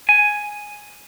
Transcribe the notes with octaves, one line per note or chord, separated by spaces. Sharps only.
G#5